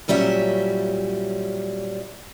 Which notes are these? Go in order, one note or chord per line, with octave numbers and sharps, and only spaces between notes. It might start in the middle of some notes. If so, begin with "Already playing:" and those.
A#2 F#3 G3 C#4 E5